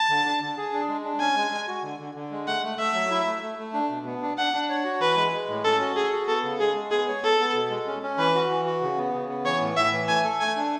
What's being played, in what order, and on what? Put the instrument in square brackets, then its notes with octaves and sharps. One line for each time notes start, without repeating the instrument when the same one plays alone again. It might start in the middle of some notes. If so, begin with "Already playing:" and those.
Already playing: [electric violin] A5
[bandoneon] D3
D4
D3
G#4
D4
G#3
D4
[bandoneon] C#4 [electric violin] G#5
[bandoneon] G#3
G#3
F#4
D3
D3
D3
G#3
[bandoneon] A3 [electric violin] F#5
[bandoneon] A3
[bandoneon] A3 [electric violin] E5
[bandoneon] F#3
E4
A3
A3
A3
D4
B2
B3
D4
[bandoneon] D4 [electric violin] F#5
[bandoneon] D4
C#5
F#4
[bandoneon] E3 [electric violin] B4
[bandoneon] G#3
G#3
A2
[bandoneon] C#4 [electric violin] A4
[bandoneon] F#4
[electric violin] G#4 [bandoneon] A4
[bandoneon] F#4
[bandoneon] B3 [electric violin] A4
[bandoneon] C#3
[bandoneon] G#3 [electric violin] G#4
[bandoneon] G#3
[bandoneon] B3 [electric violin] G#4
[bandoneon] C#5
[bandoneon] B3 [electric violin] A4
[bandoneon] B3
B2
G#3
C#4
C#4
[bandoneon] E3 [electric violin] B4
[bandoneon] F#4
E3
F#4
C#3
B3
C#3
B3
[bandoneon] E3 [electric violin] C#5
[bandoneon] A2
[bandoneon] A2 [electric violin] E5
[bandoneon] E3
[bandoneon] A3 [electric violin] G#5
[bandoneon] A4
[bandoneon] A3 [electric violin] G#5
[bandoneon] D4